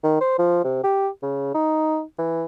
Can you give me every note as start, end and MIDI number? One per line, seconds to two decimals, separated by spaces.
0.03 0.17 51
0.21 0.34 72
0.39 0.63 53
0.64 0.83 48
0.84 1.09 67
1.23 1.49 49
1.54 2.02 63
2.18 2.45 52